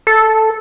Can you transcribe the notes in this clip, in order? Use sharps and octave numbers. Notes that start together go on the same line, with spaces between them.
A4